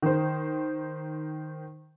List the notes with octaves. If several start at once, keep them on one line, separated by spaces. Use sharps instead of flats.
D#3 C5